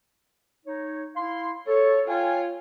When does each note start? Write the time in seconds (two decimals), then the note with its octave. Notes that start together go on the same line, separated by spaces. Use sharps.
0.66 D#4 C#5
1.16 E4 F5 C6
1.67 A4 C#5
2.08 F4 C#5 G5 G#5